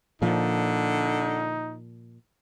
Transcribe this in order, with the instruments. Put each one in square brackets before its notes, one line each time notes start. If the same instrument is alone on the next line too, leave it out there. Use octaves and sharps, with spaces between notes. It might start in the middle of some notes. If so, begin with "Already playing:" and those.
[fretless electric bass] A#2 F3 [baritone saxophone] D3 [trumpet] D#4